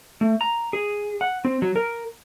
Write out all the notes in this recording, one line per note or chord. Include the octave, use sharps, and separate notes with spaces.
A3
A#5
G#4
F#5
C4
F#3
A#4